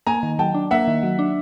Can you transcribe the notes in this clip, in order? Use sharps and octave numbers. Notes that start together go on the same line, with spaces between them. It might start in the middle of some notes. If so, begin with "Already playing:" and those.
A#3 G#5 A#5
D#3
F#3 G5 A5
D4
A#3 E5 F#5
D#3
F#3
D4